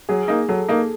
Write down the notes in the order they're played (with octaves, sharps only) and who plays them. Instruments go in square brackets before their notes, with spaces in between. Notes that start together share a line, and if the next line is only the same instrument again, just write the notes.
[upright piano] F#3 [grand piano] G#4
[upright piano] A#3 D#4
[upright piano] F#3 [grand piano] A4
[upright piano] A#3 D#4